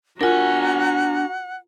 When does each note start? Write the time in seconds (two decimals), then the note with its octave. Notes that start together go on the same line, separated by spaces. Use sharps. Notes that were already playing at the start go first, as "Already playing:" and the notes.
0.21 D4 F4 F#4 A#4 F#5 G#5 A#5